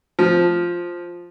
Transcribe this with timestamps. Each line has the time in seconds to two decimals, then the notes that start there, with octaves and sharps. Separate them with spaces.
0.19 F3